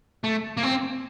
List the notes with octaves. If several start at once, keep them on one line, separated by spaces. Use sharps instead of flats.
A3
A#3
C4